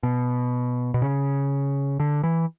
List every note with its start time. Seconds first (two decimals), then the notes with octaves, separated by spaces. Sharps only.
0.03 B2
0.94 B2
1.02 C#3
2.00 D3
2.23 E3